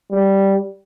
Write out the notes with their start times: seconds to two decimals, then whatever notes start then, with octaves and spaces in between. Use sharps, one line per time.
0.11 G3